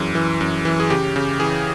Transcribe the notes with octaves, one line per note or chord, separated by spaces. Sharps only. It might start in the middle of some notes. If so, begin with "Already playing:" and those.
Already playing: F#2 E3 G#4
E3
F#2
E3
G#4
C#3 G4
C#3
E3 G#4